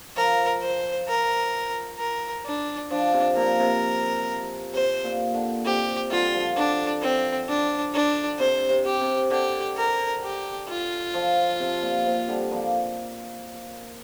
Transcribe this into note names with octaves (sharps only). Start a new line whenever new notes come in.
F3 A#4
C5
A#4
A#4
D4
F3 D4
C3
A#2 A#4
C3
C3 C5
A#2
D3
C3 G4
D3 G3 F4
F3
D3 D4
C4
D4
D4
C3 C5
C3
G4
C3
D3 G4
A#4
G4
F4
F3
C3
A#2
C3
D3 G3
F3 A#3